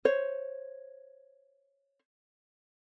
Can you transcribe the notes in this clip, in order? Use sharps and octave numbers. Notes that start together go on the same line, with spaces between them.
C5 C#5